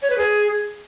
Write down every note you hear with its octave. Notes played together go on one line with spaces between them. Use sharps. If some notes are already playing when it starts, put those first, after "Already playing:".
C#5
B4
G#4